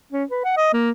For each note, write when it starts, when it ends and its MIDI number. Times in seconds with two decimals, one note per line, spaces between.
0.12 0.24 61
0.30 0.42 71
0.45 0.56 78
0.57 0.69 75
0.73 0.91 58